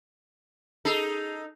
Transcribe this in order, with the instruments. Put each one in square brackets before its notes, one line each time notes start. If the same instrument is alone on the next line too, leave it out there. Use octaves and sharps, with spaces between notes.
[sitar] D#4 A4 [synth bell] G#4 C7 F7